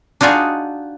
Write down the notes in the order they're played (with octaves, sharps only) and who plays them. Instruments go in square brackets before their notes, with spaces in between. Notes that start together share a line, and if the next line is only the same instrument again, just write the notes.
[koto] D4 D#4 F4 F#4 G#4